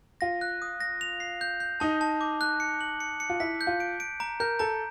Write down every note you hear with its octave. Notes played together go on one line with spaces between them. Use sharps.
F4 A#6
F#6
D#6
A#6
F7
C7
G6
G6
D#4 A5
A5
D6
F#6
C#7
F#7
C#7
C#7
F4
E4 B6
G6
F4
D7
D7
A#5
A#4 G6
A4 A#5